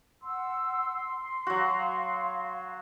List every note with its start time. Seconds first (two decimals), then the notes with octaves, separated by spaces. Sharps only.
0.23 F#5 C6 E6
1.47 F#3 F#4 F5